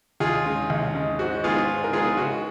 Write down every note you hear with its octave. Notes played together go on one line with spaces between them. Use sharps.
D#2 F4 G#4
C#3 G#3
D#2
C#3 G#3
G#2 F#4
D#3 G#3 B3 F4 G#4
G#2
A#4
D#3 G#3 B3 F4 G#4
C#2 F#4